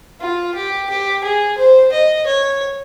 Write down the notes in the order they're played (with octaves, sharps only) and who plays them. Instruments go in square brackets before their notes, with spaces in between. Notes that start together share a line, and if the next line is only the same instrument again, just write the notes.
[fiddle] F4
G4
G4
G#4
C5
D#5
C#5